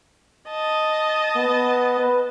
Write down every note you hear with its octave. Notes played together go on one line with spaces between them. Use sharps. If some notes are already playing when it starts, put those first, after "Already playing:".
D#5 A5
B3
B4